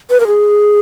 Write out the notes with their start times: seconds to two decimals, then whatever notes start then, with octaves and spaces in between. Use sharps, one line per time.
0.10 B4
0.20 A#4
0.27 G#4